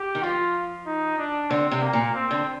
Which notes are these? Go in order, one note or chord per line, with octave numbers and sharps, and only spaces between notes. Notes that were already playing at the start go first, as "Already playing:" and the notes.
Already playing: G4
D#3
F3 F4
D#4
D4
D3 C4
C3
A#3
A#2
C4
D3